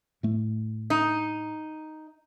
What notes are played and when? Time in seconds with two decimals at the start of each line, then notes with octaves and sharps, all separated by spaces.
0.23 A2 A3
0.90 D#4